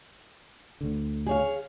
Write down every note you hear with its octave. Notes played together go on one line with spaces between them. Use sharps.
D2 D3
G#4 C#5 F5